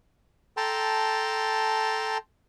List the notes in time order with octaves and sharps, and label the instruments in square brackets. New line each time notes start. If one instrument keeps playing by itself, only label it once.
[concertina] A4 G5 A5 A#5 C6